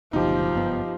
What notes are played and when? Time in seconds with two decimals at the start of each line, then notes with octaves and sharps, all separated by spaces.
0.13 F#1 D2 B2 F3 D#4 G4
0.54 F#1 G2 B3